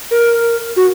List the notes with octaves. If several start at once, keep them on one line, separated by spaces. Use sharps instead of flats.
A#4
F#4